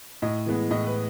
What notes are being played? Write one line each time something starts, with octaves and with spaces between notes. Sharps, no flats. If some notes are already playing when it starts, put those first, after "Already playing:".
A2 D#5
E3 G#3 B3
A2 D#5
B4